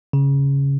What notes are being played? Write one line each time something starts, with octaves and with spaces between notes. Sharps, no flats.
C#3